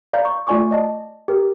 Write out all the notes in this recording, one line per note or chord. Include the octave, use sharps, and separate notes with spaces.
D5 F5 A#5 G6 A6
C#6
A3 F4 D5 G#5 C#6 D6
D5 D#5 A5
G4 A#4